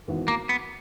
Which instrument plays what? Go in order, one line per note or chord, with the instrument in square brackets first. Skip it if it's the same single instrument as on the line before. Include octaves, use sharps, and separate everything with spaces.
[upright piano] G#1 G#2 E3 B3 F#4
[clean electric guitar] A#3
B3